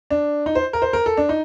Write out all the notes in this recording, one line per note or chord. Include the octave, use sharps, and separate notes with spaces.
D4
D#4
C5
A#4
C5
A#4
A4
D4
D#4